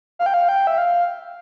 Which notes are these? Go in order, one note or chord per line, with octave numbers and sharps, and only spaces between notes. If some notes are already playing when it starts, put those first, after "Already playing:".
F5
G5
F5
G5
E5
F5